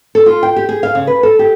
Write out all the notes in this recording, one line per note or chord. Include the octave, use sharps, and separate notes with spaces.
A4
F4
G5
G4
G#4
F5
C#3
B4
A4
G4